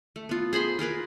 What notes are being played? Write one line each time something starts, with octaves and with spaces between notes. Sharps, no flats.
A3
B3 F4
G#4 C5 B5 C6
F4 G#4 A#4 B4